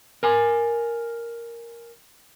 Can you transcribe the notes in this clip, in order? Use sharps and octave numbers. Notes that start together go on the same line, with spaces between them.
A#4 G#5